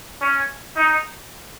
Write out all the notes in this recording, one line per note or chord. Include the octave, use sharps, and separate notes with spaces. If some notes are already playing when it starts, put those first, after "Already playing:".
C#4
D#4